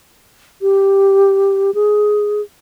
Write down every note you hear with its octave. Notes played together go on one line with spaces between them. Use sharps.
G4
G#4